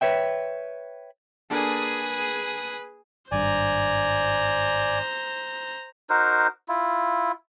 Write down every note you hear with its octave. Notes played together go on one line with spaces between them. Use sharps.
B4 C#5 E5 G5
A#3 D4 G#4 A4 B4 D#6
G#1 G2 C5 D5 G#5 A#5
D#4 F#4 A#4 C5
E4 F4